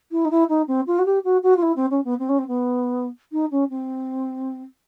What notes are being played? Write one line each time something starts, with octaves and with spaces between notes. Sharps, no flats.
E4
D#4
E4
D#4
C4
F4
F#4
G4
F#4
F#4
F4
E4
C4
C#4
B3
C4
C#4
C4
B3
D#4
C#4
C4